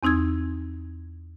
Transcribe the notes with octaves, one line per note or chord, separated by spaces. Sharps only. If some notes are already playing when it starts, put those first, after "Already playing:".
E2 C4 D#4 E6 G#6